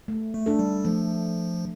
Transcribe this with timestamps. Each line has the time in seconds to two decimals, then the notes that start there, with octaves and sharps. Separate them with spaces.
0.08 A3
0.34 A3
0.46 D4 A4
0.59 G3
0.85 F3 A3